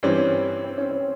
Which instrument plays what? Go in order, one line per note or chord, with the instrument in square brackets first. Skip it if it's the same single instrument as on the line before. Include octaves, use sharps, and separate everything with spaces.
[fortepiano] G2 E3 G3 C4 [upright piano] C#4
[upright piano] C4
C#4
C4